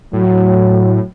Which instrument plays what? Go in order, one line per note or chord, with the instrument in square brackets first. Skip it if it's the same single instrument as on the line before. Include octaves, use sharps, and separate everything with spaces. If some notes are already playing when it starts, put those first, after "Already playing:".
[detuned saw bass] A2 [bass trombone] F#3